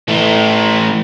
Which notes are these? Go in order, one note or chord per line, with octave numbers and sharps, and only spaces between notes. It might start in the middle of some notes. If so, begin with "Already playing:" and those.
E3 A3